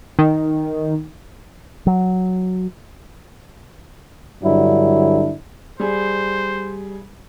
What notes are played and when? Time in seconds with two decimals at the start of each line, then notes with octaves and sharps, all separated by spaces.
0.19 D#3
1.87 F#3
4.44 G2 D3 F#3 D4 E4
5.80 G3 G#4 C5